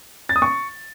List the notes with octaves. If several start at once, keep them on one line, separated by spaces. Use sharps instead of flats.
A6
D#6
C#6